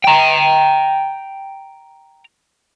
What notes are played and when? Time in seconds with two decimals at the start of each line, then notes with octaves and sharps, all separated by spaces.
0.04 G5 A#5